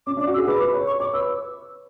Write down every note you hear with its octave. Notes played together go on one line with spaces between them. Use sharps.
C#4 D6
D4
D6
F#4
E6
G#4
B4 D6
B4
C#5
C#6
C#5 D6
B4 E6